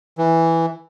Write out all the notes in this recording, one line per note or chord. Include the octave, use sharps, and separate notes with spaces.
E3